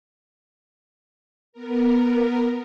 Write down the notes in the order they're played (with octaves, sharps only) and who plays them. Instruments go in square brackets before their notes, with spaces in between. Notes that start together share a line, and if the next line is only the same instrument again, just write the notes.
[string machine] B3 A#4